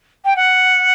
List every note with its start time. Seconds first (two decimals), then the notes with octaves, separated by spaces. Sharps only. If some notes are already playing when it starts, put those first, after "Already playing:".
0.25 G5
0.36 F#5